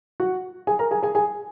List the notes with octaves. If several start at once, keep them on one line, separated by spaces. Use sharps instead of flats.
F#4 F#5
G#4 G#5
A#4 A#5
G#4 G#5
G#4 G#5
G#4 G#5